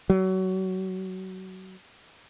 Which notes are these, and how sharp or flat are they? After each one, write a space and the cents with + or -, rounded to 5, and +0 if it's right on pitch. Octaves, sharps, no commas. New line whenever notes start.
F#3 +25